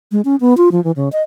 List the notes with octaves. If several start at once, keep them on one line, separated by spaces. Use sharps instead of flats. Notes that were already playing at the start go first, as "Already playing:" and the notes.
G#3
C#4
B3
F4
F3
E3
C#3
D#5